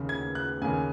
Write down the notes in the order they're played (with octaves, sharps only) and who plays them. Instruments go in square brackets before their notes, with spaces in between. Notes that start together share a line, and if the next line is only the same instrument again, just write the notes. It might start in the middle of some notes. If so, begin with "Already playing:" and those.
Already playing: [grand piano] D#2 C#3
G#6
F#6
D#2 C#3 G#5